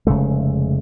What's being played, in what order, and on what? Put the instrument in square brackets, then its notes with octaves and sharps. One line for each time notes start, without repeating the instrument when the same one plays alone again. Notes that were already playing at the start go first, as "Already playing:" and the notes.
[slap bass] F1 C#3 G#3 A3